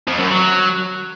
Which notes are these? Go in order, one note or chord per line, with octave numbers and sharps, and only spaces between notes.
F2
F#2
F#3